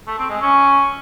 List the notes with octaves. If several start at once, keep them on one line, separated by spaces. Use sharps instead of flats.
A3
C4
G#3
C#4